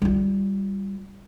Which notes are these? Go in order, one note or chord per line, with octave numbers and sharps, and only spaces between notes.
G3 F4